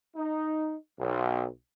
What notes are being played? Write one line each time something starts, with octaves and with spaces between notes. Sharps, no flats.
D#4
B1